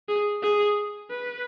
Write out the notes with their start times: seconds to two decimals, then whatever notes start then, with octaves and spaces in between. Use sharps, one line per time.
0.09 G#4
0.42 G#4
1.10 B4